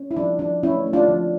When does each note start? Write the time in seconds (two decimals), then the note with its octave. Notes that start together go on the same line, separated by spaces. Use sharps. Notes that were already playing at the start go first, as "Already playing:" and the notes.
Already playing: C#4
0.11 E4
0.17 F3 D4
0.39 F3 D4
0.63 A3 C#4 E4
0.86 A3
0.93 D4 F4
1.08 F3